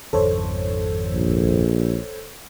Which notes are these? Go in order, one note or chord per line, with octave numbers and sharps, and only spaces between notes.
G#1 F2 D#3 A4 C5 C#5
A#1